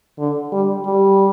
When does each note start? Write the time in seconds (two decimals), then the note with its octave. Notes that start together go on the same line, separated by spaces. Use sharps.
0.19 D3
0.52 G3
0.86 G3